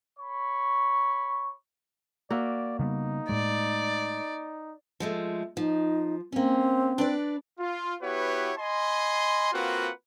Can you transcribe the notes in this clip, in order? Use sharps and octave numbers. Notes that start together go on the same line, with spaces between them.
C#5 B5 C#6
A#3 F#4 D5 E5
C#3 G3 B3 D#4
A2 G#3 D5
F3 G#3 A3
F3 D#4
A#3 C4 C#4
D4 B4 D5
F4
B3 E4 F#4 G4 B4 C#5
D#5 G#5 B5 C6
A#3 C4 F4 F#4 B4 F#5